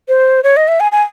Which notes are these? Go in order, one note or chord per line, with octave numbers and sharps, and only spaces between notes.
C5
C#5
D#5
E5
G#5
G#5